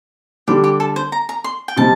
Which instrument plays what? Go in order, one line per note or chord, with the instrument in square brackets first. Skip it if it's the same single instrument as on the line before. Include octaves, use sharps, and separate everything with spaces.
[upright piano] D3 G3 D4 [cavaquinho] G4
[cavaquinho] G4
A4
C5
A#5
A#5
C6
G5
[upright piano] C3 G3 C4 D#4 [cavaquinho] A5